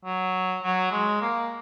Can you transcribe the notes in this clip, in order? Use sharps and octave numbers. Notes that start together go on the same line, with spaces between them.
F#3
F#3
G#3
A#3